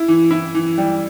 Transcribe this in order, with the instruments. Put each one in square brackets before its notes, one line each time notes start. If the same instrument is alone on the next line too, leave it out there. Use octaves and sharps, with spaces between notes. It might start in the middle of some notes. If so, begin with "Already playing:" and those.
Already playing: [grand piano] E4
E3
E4
E3
G3